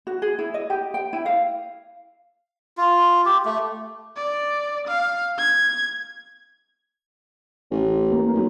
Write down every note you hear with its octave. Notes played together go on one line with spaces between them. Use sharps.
F#4
G#4
E4
D#5
G4
G5
E4
F5
F4
G4
A3
D5
F5
G#6
A1
A#3
B1